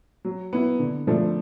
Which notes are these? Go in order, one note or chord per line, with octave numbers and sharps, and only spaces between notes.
F#3
B3 E4
D3
F3 A3 D4